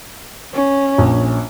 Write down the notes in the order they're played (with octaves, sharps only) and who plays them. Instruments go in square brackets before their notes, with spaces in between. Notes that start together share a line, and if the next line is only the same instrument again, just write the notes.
[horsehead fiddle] C#4
[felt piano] A#1